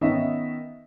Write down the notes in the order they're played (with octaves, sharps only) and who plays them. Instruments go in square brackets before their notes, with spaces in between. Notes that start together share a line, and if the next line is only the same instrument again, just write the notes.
[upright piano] D#3 B3 C#4 D#4 D#5 E5